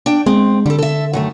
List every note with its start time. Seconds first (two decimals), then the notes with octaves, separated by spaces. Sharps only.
0.06 D4 G5
0.26 G#3 C4
0.66 D3 G3 A4
0.78 A4 E5
1.13 F#2 D#3 A3